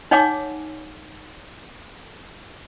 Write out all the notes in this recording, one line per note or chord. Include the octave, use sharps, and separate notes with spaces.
D#4 C#5 F#5 G#5 D6